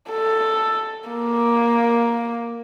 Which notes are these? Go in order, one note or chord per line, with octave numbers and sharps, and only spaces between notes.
A4
A#3